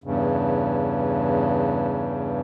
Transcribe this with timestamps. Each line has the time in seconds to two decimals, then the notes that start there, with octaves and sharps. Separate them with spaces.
0.04 E2 G2 C#3